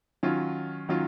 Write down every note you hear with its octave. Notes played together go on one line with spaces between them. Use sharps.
D#3 F#3 C#4 F4
D#3 F#3 C#4 F4